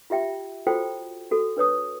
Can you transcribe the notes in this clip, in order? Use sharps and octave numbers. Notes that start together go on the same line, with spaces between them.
F4 G4 E5 G5
F4 F#4 A4 C5 G5
F#4 A4
D4 B4 C#5 D#6